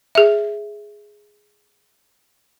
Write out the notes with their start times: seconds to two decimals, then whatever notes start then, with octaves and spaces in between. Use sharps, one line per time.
0.15 G#4 E5